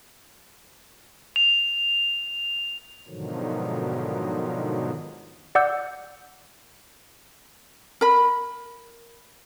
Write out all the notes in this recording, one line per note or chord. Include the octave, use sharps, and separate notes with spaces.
F7
G#2 B2 D3 D#3 F3 F#3
D5 F#5 D6 E6 G6
A#4 B5